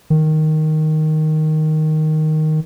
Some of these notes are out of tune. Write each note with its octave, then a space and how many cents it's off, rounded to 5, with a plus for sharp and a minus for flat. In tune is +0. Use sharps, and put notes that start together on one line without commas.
D#3 +0